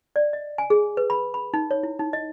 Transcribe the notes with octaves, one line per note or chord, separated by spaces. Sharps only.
D5
D#5
G#5
G#4
B4
B5
B5
D#4
C#5
E4
D#4
D#5